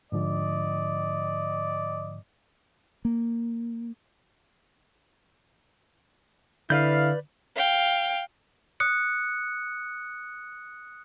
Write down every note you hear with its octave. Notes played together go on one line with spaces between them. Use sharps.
G#2 D3 F3 D5 D#5
A#3
D3 E4 B4 D5 F5 G6
F5 G5
D#6 F#6 C#7